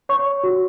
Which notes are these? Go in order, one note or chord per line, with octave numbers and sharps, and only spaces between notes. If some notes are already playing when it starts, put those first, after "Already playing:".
C#5 C#6
F#4